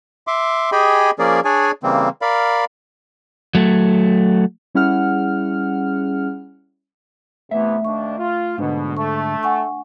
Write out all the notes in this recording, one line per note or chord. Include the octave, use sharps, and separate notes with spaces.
E5 C6 D6
G4 G#4 D#5 G5 G#5 B5
F3 A#3 C#4 G#4 A#4 D5
D4 G#4 C#5 D5 G#5
C#3 E3 G3 A#3 C4
A#4 D5 F5 B5
F#3 A3
G3 C#4 E4 G#4 F#5 F6
C3 E3 A3 B3 E5
D#2 D4 C#6
F4
G#2 B2 D3 D4
A3 C#6
F#5 G#5 C#6